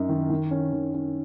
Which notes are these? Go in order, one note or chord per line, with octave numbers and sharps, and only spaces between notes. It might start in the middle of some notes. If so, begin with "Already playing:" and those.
Already playing: F#2 D#4
D#3
D#3
C#4
D#3
C#4